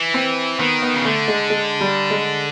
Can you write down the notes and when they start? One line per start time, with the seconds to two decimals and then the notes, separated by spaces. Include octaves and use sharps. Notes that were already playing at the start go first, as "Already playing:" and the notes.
Already playing: E3
0.14 C4
0.59 D#3 B3
0.82 B3
0.94 C#3
1.05 D3 A3
1.28 G#3
1.50 G#3
1.81 G3
2.11 G#3